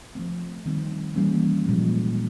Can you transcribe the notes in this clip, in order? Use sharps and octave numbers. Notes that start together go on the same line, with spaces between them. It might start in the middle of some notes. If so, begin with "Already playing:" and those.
F3 A3 C4
D#3 G3 C4
E3 G3 A#3 C#4
A#2 F3 G#3